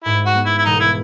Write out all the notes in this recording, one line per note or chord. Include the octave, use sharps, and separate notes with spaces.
G#2 E4
F#4
B3
E4
E4
E1 D#4
E4